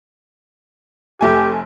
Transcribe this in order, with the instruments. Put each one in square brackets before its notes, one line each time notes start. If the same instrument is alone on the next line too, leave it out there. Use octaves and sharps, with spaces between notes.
[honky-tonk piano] F1 A3 G#5 [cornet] G4